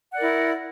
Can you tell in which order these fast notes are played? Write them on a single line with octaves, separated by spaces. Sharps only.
F#5 D5 A#4 E4